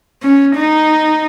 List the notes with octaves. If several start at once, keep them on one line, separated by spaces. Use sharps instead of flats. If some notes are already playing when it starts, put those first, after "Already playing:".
C#4
D#4